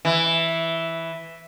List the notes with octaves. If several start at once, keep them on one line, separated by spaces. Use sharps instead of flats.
E3